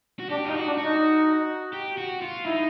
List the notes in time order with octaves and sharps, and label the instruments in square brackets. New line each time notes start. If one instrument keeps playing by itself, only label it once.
[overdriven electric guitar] F#4
[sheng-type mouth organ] D4 [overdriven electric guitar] G4
[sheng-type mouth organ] D#4 [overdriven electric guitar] F4
[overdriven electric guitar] F#4
[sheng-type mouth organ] D4
[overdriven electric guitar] F#4
[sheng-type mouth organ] D#4
[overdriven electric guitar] G4
F#4
F4
[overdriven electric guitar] D#4 [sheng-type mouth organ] E4